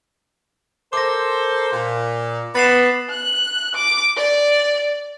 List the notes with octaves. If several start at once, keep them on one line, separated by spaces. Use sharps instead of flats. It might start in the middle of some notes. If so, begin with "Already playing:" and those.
A4 A#4 C5 D6 A#6
A#2
B3 A6 C7 E7
F#6
D6
D5